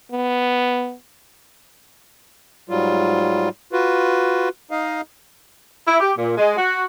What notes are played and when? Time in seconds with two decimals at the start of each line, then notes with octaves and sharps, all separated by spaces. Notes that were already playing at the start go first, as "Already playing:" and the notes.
0.12 B3
2.69 G#2 F#3 G3 F4
3.73 F4 F#4 B4
4.71 D#4 D#5 F5
5.88 E4
6.00 G4
6.17 A#2
6.37 G#3
6.57 F#4